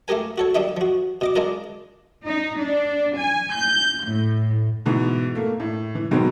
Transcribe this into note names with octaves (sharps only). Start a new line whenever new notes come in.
A3 A#3 G4 A#4 G#5
F#4 A4 C#5
G3 A#3 D4 D#4 E5
F3 F#4
B2 D#5 D6
G#3 D4 F4 A#4 D5
D#4
D4
G#5
G6
A2
G#2 B2 E3
A3 A#3
A2
E3
B2 D#3 F#3 G#3 B3 C4